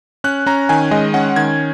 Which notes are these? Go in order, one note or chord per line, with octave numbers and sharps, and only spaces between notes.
C#4 F#6
C#4 A#5
D#3 G#5
G#3 D#5
C#4 F#5
D#3 G#6